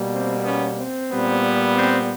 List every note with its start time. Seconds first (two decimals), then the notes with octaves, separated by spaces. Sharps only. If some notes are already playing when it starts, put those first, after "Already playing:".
Already playing: B2 G3 A#3
0.13 C4
0.45 B3 C#4
0.78 C4
1.10 A#2 G3 B3
1.75 C4